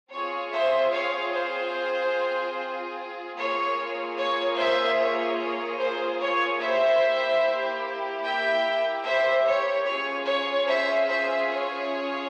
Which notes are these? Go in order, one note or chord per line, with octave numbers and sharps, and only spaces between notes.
C4 F4 G#4 C#5
C5 E5
C#5 F5
C5
A#3 F4 G#4 C#5
C#5
C5 E5
C#5
C#5
C5
C#5
A#3 E4 G4 C5 E5
E5 G5
C5 E5
C#5
C#4 F4 G#4 C#5
C#5
C5 E5
C5 E5
C#5